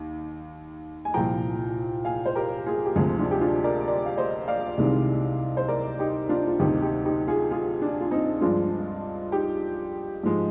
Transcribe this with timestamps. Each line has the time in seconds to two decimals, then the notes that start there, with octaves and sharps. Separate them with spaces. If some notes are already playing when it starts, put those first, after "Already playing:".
Already playing: D#2
1.05 G#5
1.14 C2 A#2 F3 G5 A#5
2.05 F5 G#5
2.26 C5
2.35 G4 A#4
2.66 F4 G#4
2.86 G4
2.96 D2 C3 F3 G#3 F4 G#4
3.19 D4 F4
3.31 G4
3.41 D4 F4
3.64 A#4 D5
3.87 A#4 D5
4.06 F5
4.17 C5 D#5
4.48 D5 F5
4.78 C2 C3 D#3 G#3
5.57 C5
5.68 A#4 D5
5.99 D#4 G4
6.29 D4 F4
6.47 F4
6.59 D2 C3 D#3 D#4 G4
6.82 D#4 G4
7.05 D#4 G4
7.27 F4 G#4
7.51 F4 G#4
7.82 D4
8.01 F4
8.11 C4 D#4
8.41 G2 F3 G#3 D4 F4
9.32 D#4 G4
10.23 G#2 F3 G#3